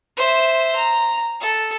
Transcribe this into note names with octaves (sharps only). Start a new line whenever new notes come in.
C5 E5
A#5
A4